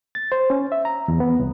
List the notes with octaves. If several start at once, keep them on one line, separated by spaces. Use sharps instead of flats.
A6
C5
C#4
E5
A#5
E2
B3
C2